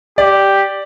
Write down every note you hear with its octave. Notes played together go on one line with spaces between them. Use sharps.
G4 D5